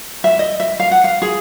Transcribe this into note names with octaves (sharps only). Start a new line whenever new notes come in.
E5
D#5
E5
F5
F#5
F5
G#4